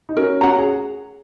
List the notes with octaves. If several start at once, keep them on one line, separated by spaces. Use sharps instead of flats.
D#4
C#4 F#4 A#4
C#4 F#4 F#5 A#5
G#4